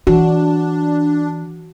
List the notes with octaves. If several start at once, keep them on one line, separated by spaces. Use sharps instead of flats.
E3 D4 F#4